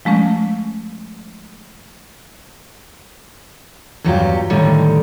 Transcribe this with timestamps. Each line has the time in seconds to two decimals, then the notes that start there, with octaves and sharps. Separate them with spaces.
0.05 F3 G#3 A3 C#4
4.04 E2 G2 F#3 F4 G4
4.50 A2 D3 D#3 G3